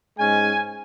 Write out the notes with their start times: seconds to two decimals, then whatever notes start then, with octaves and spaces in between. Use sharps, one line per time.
0.19 G#2 G#3 C#4 G#5